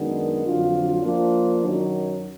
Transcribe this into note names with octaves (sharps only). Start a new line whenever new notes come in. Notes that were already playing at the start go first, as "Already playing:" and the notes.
Already playing: F#2 D#3 G#3 B3 D4
F2 D3 F#3 D4 F4
F3 A#3 D4 F4
F#2 D#3 F#3